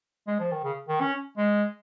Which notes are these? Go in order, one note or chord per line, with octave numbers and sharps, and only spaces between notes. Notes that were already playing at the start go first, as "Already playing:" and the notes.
G#3
F3
D#3
C#3
D#3
C#4
G#3